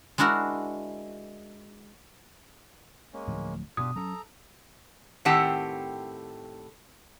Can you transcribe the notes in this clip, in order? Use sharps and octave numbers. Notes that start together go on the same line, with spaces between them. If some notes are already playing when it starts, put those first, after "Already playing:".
G#3 D4 E4 F#4 A#4
G#3 A#3 C#4
D1 A2 F3
G2 B2 D4 F4 G4 D#6
F#3 C#4 A4 A#5
A2 D#3 C4 G4 F#5 A5